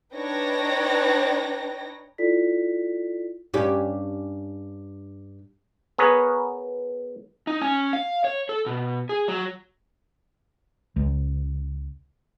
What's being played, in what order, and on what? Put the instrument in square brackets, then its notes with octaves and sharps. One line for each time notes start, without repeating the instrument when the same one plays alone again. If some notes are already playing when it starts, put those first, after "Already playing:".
[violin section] D4 D#4 B4 C#5 G5 A#6
[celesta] E4 F4 A4 D5 B6
[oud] G2 C#4 G4
[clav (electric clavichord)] B3 G#4 A#4 B4 C#5
[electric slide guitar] D#4
C#4
F5
C#5
A4
B2
G#4
F#3
[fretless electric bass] C#2